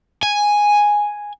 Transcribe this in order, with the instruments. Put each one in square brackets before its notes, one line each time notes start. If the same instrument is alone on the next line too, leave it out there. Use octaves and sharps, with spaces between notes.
[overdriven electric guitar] G#5